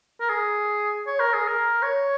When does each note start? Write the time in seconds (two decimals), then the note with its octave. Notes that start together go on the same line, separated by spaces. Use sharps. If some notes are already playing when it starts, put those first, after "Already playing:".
0.20 A#4
0.30 G#4
1.07 C#5
1.20 A#4
1.34 G#4
1.48 A#4
1.83 C#5